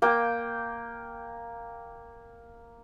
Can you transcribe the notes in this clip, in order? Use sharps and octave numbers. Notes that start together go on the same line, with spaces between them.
A#3 G5